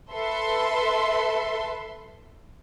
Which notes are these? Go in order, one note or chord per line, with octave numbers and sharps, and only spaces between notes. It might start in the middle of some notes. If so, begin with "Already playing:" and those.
A4 B4 E5 C6